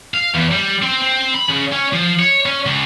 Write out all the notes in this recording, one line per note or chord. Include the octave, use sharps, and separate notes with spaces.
F5
E2
G3
C4
C4
B5
C#3
C#4
F3
C#5
C#4
C#2